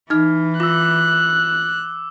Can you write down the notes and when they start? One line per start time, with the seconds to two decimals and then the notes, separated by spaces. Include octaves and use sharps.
0.10 E3 D#4 F6
0.60 F4 D6 E6 F#6